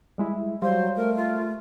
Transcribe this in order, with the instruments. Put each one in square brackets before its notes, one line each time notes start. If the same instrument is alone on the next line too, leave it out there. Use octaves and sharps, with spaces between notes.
[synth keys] G3 G#3 E4
[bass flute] F#3 [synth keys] G3 [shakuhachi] C5 [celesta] D5 F5 C6
[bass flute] A3 [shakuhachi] A#4
[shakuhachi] F4